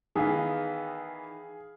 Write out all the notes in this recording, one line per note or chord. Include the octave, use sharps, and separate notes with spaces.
D#3 E3 B3 G#4 F5